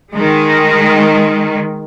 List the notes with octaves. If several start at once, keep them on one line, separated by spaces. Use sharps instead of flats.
D#3 G#3